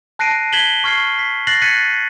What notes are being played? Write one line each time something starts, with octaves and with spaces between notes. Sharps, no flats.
A5 F#6 A#6 C7 D7 D#7
G#6 B6 E7 F#7 G7
C#6 F6 G#6 C7
B6
F#6 A6 A#6 C7 F#7
F#6 G#6 A6 B6 C#7 D#7